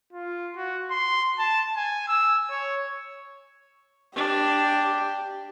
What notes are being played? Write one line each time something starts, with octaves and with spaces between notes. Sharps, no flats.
F4
F#4
C6
A5
G#5
E6
C#5
D4 G4